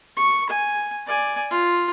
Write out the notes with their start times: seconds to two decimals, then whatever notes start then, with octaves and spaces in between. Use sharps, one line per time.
0.17 C#6
0.49 G#5
1.07 D5 G#5
1.51 F4